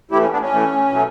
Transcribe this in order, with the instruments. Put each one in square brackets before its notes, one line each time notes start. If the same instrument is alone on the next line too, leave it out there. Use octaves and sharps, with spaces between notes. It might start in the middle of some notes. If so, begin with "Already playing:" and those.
[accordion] A2 E3 A3 E4 G4
C#4
B3 D4
C#4
A2 E3 A3
B2 F#3 A3